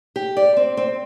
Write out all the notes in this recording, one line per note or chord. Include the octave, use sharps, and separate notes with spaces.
G4
D5
C4
C4